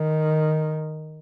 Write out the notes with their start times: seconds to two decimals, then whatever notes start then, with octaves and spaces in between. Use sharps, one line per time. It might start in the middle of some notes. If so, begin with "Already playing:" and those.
Already playing: D#3